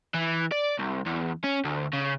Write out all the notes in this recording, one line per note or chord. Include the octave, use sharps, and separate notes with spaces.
E3
D5
C2
E2
C#4
D2
C#3